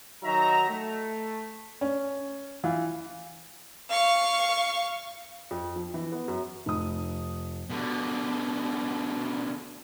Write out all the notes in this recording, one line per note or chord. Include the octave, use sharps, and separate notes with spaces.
D#3 F#3 D#4 F#4 E5 A#5
A3
C#4
E3 F4
F5 C#6
F2
F3
E3
B3
F#2
F1 D#6
B2 D3